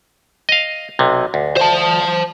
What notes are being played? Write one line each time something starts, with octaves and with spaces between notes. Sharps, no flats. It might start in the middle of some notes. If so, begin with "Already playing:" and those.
D#5 F5
B1 C3
D2
C5 A5